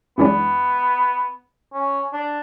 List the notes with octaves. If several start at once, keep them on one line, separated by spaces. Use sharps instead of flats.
F#2 E3 G#3 B3 D4
C#4
D4